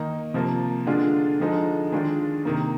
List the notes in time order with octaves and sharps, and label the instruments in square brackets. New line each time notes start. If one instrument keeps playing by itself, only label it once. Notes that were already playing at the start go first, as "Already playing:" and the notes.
Already playing: [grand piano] D#3 A#3 D#4
C3 F3 A#3
D3 G#3 D4 F4
D3 F3 G#3 D#4
D#3 G#3 D4 F4
C3 D#3 A#3